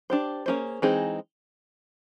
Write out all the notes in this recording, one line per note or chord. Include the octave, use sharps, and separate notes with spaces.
D4 G4 C5
A#3 C#4 E4 G#4 C5
E3 G#3 C4 D#4 G#4